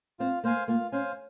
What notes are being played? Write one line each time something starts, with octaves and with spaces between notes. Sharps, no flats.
C4 F4
A#3 C5 F5 G#5
A#3 F4
C#4 C5 F5 G#5